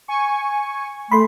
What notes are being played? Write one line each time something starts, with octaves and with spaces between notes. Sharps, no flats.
G#5 C#6
A3 B5 C6